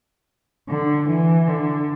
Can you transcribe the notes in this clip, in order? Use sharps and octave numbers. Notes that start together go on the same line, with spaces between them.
D3
E3
D3